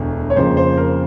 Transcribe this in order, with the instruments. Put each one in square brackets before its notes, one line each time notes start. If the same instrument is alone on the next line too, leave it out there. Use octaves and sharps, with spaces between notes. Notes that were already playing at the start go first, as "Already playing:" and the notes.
Already playing: [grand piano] E1 D2
C#5
F2 C#3 F3 A#3 C5
C5
A#4